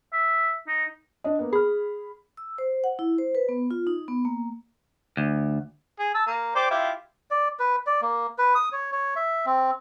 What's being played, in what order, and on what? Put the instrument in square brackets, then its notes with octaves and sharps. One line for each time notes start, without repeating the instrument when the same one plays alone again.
[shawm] E5
D#4
[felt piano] D4 D#5
A#3 B3
[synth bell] G#4 [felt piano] B5 F6
[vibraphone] E6
C5
F#5
E4
C5
B4
B3
F4
D#4
B3
A#3
[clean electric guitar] D2
[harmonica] G#4
A5 E6
A#3
G4 C5 D5
E4 F4 G4
[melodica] D5
B4
D5
A#3
B4
D#6
C#5
C#5
E5
C4